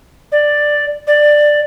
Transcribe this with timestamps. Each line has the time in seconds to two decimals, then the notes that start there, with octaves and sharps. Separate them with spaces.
0.32 D5
1.07 D5